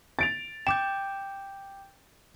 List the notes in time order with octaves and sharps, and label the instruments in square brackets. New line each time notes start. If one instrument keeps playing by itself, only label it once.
[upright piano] A6 D7 F7
[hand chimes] G5 D6 G6 [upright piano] E7